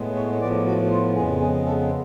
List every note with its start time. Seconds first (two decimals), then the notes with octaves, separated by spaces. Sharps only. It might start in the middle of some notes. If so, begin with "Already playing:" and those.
Already playing: A2 G#3 B3
0.16 C#5
0.41 A2 F3 B3 D5
0.66 F#4
0.91 F4
1.16 F2 C#3 G#3 B3 G#4
1.41 G#4
1.66 A4